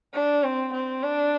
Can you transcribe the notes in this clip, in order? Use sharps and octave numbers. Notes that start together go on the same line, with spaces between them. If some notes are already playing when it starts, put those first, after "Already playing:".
D4
C4
C4
D4